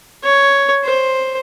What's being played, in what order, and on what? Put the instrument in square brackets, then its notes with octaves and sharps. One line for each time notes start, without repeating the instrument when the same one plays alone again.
[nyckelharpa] C#5
C5